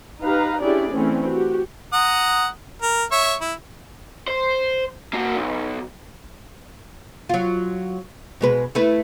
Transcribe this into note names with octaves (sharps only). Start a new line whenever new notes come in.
D#4 G4 B4 F5 A#5
C#4 D4 E4 G4 G#4 D5
E3 A3 C4 C#4
F#4 G4
F#5 A#5 D#6
A#4
C#5 E5 C#6
E4
C5
A#3 F#4
B1
F#3 F4
B2 G#3 B4
A3 E4 B4